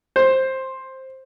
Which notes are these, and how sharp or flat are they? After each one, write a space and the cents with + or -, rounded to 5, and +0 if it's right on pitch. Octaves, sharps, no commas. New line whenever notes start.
C5 +10